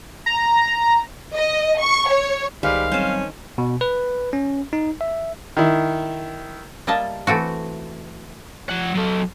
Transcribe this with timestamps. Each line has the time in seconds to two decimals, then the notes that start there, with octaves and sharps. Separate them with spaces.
0.26 A#5
1.35 D#5
1.81 C#6
2.10 C#5
2.63 C2 D#3 G3 G#3 B4 C5 F5
2.92 F#3 G3 C4 C#4 C5 A5
3.58 B2
3.81 B4
4.33 C#4
4.73 D#4
5.01 E5
5.57 D#3 E4
6.87 G3 A#3 D#5 E5 A5
7.27 E3 A3 C4 F#4
8.70 F3 F#5
8.96 F#3 A4